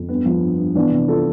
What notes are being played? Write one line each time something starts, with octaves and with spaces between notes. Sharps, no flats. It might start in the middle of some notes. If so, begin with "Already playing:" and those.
Already playing: F2
G2 B3
F3
G2
G2
E3 B3 D4
C3
F4 A4